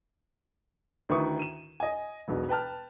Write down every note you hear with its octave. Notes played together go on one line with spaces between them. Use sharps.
D2 D#3 E4 B4 C#6 D#6
D#7 E7
D#5 G#5
E1 B1 B2
B4 G5 A5 F6